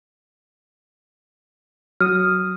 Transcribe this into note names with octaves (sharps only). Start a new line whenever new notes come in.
F#3 D#6 F6